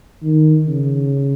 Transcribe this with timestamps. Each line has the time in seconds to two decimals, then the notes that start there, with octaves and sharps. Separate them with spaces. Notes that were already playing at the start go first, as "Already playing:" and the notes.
0.23 D#3
0.68 C#3